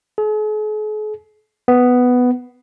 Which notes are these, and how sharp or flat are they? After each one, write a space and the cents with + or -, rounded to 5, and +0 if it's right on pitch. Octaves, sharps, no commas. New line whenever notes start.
G#4 +45
B3 +5